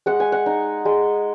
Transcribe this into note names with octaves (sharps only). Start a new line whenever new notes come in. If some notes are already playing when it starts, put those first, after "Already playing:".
G#3 F#5
G#5
F#5
D#4
G#3